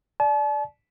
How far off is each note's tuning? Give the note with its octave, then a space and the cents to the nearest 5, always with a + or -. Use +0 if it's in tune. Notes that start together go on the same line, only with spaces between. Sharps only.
D5 +0 A5 -40